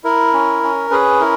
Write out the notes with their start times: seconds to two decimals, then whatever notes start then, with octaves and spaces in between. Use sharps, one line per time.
0.04 E4 A#4
0.33 C#4
0.63 C#4
0.91 C#4 G#4 B4
1.20 E4 A#4